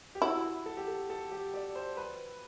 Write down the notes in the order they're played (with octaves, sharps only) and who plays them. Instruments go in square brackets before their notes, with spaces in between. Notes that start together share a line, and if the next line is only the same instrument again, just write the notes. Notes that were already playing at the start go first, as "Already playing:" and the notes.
[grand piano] G4
[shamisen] E4 [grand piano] F#4
[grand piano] A4
G4
A4
A4
G4
D5
C5
B4